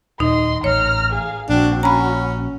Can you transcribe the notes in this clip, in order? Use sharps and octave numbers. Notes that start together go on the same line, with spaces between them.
D#1 D#4 D#5 C6
A1 C#5 A#5 F6
G#4 F5
A#1 C4 D4 F#4
C#4 F#4 A#5 B5